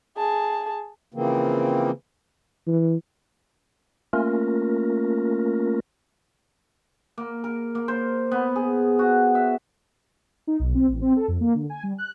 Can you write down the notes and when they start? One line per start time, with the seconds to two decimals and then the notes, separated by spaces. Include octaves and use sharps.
0.17 G#4 A5
1.14 C#3 E3 F3 A#3 C4
2.67 E3
4.13 A3 A#3 C#4 F4 A#4
7.18 A#3
7.44 A#4
7.75 A#3
7.88 C5
8.31 B3
8.56 G#4
8.99 F#4
9.35 E5
10.47 D#4
10.60 B1
10.75 C4
10.88 A1
11.02 C4
11.16 A4
11.28 F2
11.41 A#3
11.54 D3
11.70 G#5
11.83 G3
11.98 F#6